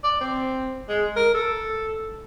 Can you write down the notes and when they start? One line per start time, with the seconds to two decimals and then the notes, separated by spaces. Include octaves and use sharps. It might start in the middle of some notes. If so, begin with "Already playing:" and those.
0.04 D5
0.21 C4
0.89 G#3
1.16 A#4
1.34 A4